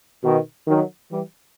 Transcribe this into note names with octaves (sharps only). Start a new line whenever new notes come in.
B2 D#3
D#3 F#3
E3 G3